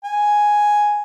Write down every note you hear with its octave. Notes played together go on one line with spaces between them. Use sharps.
G#5